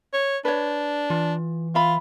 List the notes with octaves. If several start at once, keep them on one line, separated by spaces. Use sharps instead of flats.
C#5
D4 B4 C#5
E3 F4
F4 E5 B5